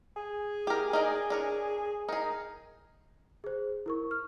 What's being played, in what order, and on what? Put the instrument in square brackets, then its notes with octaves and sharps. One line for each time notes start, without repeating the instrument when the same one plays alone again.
[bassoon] G#4
[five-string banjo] G4 A#4
D#4 A#4 D5
D4 A#4 C#5
[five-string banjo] D#4 G#4 [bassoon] A#4
[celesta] G#4 C5
E4 A#4 C#6
F6